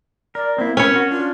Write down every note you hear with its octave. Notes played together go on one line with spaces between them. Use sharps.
A#4 D5
A#3 C4 E4
C4 C#4 A#4 B4 C#5
F#4
D4 F4